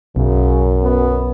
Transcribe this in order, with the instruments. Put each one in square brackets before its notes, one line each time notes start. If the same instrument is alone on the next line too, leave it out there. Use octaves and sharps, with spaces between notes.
[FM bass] B1 [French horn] F#2 [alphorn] C#3
[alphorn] B3